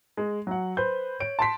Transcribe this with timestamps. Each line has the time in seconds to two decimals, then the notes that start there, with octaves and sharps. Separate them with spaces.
0.17 G#3
0.47 F#3 F#5
0.77 B4 C5 G6
1.20 C#5 D7
1.39 A5 C6 B6